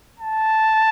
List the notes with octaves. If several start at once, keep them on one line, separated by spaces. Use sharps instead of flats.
A5